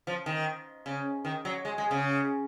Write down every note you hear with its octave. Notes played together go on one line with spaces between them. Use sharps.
F3
D#3
C#3
D#3
F#3
G#3
G#3
C#3